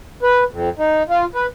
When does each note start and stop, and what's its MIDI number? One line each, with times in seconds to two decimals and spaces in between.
0.23 0.44 71
0.50 0.69 41
0.78 1.03 63
1.09 1.25 65
1.35 1.46 71